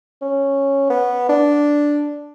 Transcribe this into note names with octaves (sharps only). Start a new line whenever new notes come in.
C#4
B3
D4